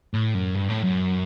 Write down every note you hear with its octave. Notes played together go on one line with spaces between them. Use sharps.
A2
F#2
G2
A2
F#2